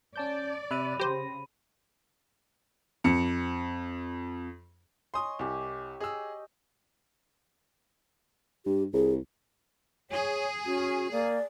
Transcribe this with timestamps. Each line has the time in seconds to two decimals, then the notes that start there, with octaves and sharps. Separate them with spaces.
0.16 C#4 D5 A5 G6
0.71 C3 E5 B5 F#6 D#7
0.99 C#3 G4 C5 A#6
3.04 F2 C#7
5.14 C#5 D#5 G#5 C6 D#6
5.39 C2 G4 G#5
6.00 G#4 D#5 E6
8.66 G2 G4
8.93 C2 G#4
10.11 G#4 C#5
10.66 C#4 F#4
11.12 A#3 D5